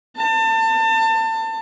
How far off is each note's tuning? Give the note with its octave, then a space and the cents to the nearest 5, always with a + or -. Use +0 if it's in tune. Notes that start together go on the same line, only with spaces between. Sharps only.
A5 +30